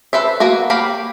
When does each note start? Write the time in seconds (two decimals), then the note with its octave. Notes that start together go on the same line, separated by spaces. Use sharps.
0.13 A4 B4 C5 E5
0.40 A#3 B3 F#4
0.70 A#3 G4 F5 B5